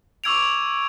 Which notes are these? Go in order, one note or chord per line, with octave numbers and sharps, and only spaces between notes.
C#6 D6 E6 G#6 D7 F7